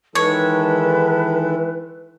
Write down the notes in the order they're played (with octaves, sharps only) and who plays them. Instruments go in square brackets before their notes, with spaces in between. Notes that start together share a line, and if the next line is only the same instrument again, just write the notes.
[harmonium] D#3 G#3 A4 [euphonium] E3 [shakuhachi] B4 [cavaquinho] C#5